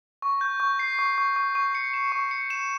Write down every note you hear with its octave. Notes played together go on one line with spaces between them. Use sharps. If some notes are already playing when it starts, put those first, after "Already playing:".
C#6
G6
C#6
C7
C#6
C#6
C#6
C#6
C#7
E7
C#6
C#7
E7